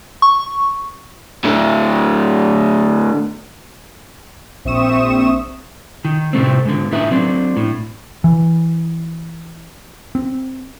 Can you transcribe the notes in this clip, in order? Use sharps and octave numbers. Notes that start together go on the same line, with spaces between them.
C#6
A2 D3
A#1 C4 E5 C#6 D#6 E7
D#3
A2 C3 A3 C4
G#2 D3
A2 D#4 B4 E5
F#3 C4 D4
A2
E3
C4